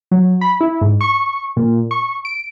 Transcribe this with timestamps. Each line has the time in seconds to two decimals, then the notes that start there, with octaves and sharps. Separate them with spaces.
0.11 F#3
0.41 B5
0.61 E4
0.81 G#2
1.01 C#6
1.57 A#2
1.91 C#6
2.25 D7